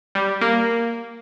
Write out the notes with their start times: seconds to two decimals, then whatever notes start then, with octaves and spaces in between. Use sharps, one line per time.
0.15 G3
0.41 A#3